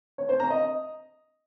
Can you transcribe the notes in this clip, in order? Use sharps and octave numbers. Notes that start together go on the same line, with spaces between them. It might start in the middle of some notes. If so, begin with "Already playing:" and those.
C#5
C5
A#5
D#5